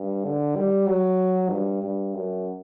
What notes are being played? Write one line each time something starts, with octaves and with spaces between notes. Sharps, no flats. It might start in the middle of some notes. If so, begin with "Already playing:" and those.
Already playing: G2
D3
G3
F#3
G2
G2
F#2